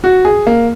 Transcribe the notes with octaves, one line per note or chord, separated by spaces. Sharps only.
F#4
G#4
A#3